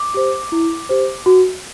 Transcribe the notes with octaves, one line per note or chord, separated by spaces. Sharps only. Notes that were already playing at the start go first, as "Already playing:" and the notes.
Already playing: D6
G4 C5
E4
G4 C5
F#4